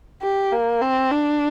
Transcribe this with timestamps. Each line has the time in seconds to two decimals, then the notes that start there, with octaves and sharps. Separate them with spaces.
0.22 G4
0.52 A#3
0.81 C4
1.11 D4